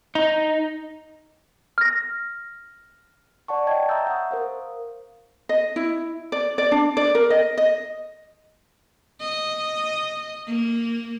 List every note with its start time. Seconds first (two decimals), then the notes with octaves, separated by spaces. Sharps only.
0.15 D#4
1.78 F6 A#6
3.48 D5 F#5 A5 C#6
3.67 C#5 D#5 G5 A5 G#6
3.88 E5 A#5 D#6 E6 G6 A6
4.07 F#5 C#6 D#6
4.31 A#4 C5 F5
5.49 D#5
5.76 E4
6.32 D5
6.58 D5
6.72 D4
6.97 D5
7.15 A#4
7.30 D#5
7.58 D#5
9.20 D#5
10.47 A#3